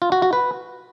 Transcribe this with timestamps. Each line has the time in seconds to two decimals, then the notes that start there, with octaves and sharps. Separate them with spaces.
0.02 F4
0.12 F#4
0.22 F#4
0.33 B4